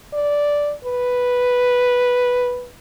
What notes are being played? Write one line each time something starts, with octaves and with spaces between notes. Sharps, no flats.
D5
B4